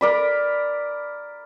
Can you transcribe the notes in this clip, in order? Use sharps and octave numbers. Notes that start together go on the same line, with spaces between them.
A#4 D5 B5